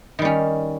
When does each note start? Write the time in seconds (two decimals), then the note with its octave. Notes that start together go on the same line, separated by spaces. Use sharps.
0.19 D#3
0.22 G3
0.25 C#4